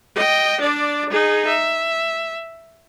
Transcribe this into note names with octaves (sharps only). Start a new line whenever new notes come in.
D#5 G5
D4 D5
D#4 G#4
E5